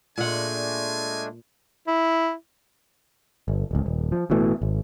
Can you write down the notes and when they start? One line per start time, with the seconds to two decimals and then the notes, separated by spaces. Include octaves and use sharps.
0.18 A#2 G#3 A3 D4 F#5 G#5
1.87 E4
3.48 G1
3.71 D1 C#2
3.86 D#1
4.12 F3
4.30 A1 B2 E3 A3
4.62 G#1